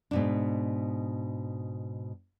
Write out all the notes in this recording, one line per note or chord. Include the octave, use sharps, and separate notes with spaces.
G#2 B2 D4